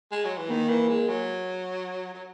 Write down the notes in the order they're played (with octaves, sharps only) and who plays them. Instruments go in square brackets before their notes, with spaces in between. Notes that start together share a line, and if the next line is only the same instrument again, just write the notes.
[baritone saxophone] G#3
F#3
E3
[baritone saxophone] D#3 [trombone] A#3
[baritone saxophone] E3
G#3
F#3
F#3